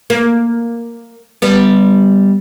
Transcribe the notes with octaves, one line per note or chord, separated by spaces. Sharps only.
A#3
G3 B3